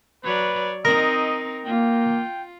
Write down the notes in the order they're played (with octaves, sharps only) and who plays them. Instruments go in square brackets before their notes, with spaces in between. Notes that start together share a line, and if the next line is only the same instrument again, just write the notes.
[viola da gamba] F#3 C#5 D5 [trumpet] B4
[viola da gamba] C4 D#4 [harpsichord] A#4 [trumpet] D#5
[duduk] A#3 [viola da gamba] F4 [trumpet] G5